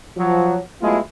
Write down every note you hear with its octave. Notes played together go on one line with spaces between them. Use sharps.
F3 F#3
F#3 G#3 A3 B3 E4 F4